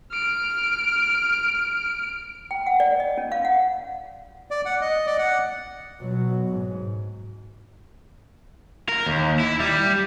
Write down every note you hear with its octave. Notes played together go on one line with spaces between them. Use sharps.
F6 D7
G5
F#5
D5
D#5
C#4
F5
F#5
D5
F#5
D#5
D5
F#5
B2 F#3
G#2
A#4
D#2
E4
G3